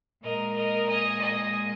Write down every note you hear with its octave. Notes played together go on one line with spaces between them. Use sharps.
A#2 G#3 A#4 D#5
A#4 D#5
D#5 G#5
D#5 G#5